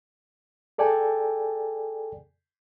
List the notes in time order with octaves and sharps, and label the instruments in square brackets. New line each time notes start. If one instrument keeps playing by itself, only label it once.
[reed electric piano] G#4 A4 D5 G5 G#5